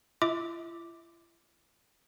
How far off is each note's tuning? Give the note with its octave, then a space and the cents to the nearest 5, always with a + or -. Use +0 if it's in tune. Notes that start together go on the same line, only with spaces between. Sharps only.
E4 +45 E5 -40 D6 +0